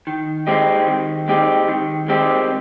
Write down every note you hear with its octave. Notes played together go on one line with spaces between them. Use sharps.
D#3
G#3 C4 D#4 G4
D#3
G#3 C4 D#4 G4
D#3
G#3 C4 D#4 G4